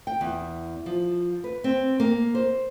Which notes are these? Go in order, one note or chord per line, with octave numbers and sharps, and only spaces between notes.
G5
E2
F3
B4
C4
A#3
C5